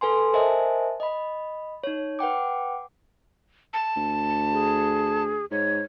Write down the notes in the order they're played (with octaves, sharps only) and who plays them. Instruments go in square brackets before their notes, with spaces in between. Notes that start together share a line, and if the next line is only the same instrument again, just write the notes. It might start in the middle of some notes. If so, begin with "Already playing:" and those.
[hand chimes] A4 B4 G#5 C6
A#4 C5 D#5 E5 G#5 A5
D#5 B5
D#4 C#5
B4 F#5 G5 D6
[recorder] A5
[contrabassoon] D2
[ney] G#4
[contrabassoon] G#2 [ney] C#5